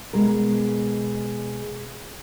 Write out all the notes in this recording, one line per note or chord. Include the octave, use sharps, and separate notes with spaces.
B2 G#3 A#4